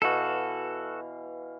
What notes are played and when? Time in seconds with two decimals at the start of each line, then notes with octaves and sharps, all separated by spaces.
0.02 B2 E3 F#4 A4 F5